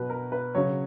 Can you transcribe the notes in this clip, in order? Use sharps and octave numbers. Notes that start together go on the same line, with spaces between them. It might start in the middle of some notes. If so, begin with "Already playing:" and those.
Already playing: B2 F#3 B4
A#4
B4
C#3 F#3 C#5